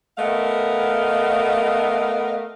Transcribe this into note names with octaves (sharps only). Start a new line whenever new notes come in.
A3 B3 A#4 D#5 F5